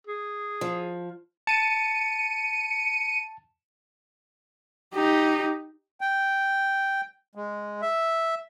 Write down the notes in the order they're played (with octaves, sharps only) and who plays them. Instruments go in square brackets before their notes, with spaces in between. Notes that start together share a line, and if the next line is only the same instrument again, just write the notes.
[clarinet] G#4
[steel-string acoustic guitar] F3
[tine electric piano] A5 [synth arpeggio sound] C#7 D#7
[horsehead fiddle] D#4 G4
[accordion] G5
G#3
E5